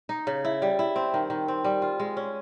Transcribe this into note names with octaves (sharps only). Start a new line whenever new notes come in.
D#4
C#3
E4
G3
E4
C4
D#3
D#3
C4
G3
F4
G#3
C#4